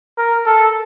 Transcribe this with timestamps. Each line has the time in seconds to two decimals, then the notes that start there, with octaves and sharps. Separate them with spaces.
0.18 A#4
0.46 A4